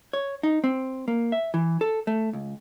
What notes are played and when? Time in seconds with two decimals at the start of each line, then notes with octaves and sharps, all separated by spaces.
0.13 C#5
0.43 D#4
0.64 C4
1.08 A#3
1.32 E5
1.54 E3
1.81 A4
2.07 A3
2.33 C#2